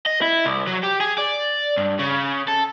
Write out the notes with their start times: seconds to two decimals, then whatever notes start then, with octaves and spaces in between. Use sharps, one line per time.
0.06 D#5
0.22 E4
0.46 C2
0.67 F#3
0.83 G4
1.00 G#4
1.18 D5
1.77 G2
1.99 C#3
2.48 A4